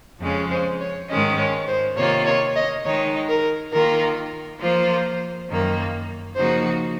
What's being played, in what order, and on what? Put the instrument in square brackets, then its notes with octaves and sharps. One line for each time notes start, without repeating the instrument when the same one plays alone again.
[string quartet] F2 C#3 G#3 C#4
[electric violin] C5
C#5
[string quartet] G#2 D#3 G#3 C#4 [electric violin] D#5
[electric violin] C#5
C5
[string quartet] C3 D#3 A#3 F4 [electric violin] C#5
[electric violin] C#5
D#5
[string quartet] D#3 G#3 D#4 [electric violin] C#5
[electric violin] A#4
[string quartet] D#3 A#3 F4 [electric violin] A#4
[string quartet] F3 A#3 F4 [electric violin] C5
[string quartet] F#2 D#3 A#3
[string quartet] C#3 F3 A#3 D#4 F#4 [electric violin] C5